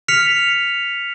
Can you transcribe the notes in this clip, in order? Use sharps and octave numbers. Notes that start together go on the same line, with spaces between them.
F6 B6 C#7 F7